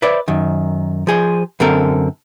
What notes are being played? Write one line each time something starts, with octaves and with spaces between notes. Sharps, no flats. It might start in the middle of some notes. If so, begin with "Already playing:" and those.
B4 C5 D5 E5
F#2 D#3
F3 G#4 C5
F#2 D3 C4 A4 A#4